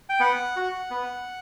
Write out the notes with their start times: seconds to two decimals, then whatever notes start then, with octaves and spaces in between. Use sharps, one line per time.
0.09 G5
0.20 B3 F#5
0.56 F#4
0.91 B3